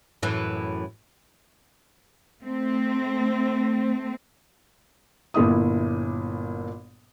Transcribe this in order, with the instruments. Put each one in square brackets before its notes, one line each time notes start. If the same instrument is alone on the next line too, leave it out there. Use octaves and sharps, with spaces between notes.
[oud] F#2 A2 E3
[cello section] A3 C4
[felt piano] G1 A#2 E4 D#6